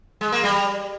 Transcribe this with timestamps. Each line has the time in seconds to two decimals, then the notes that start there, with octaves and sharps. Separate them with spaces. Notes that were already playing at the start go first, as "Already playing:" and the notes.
0.21 G#3
0.32 A#3
0.44 G3